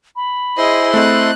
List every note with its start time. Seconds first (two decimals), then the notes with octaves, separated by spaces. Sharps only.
0.16 B5
0.58 E4 G#4 C5 D#5 C6
0.94 A3 C4 D#5 F#6